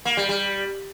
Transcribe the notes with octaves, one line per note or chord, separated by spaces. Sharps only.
A#3
G3
G3